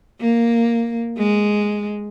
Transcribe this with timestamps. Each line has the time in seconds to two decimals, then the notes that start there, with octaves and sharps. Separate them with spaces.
0.20 A#3
1.17 G#3